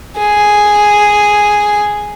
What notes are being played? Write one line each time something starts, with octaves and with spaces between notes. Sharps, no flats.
G#4